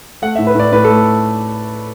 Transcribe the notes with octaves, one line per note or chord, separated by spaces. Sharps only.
A3 F#5
E5
A2
B4
A2 D5
A2 B4
A4
A3